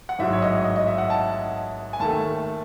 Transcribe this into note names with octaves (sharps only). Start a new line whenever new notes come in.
F#5
A1 G#2 F#3 E5
C#5
D#5
D#5
D#5
D#5
E5
F#5
A5
G#5
D#2 D#3 A3 A5